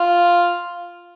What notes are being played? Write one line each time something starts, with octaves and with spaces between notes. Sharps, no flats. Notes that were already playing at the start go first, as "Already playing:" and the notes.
Already playing: F4